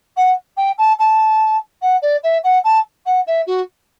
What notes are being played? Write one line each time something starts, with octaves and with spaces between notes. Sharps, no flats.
F#5
G5
A5
A5
F#5
D5
E5
F#5
A5
F#5
E5
F#4